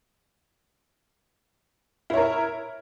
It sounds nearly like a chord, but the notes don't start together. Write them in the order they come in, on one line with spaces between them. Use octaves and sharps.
E4 C#5 A#4